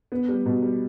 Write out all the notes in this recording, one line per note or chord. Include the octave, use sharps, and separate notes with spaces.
B3
G3
B2
G3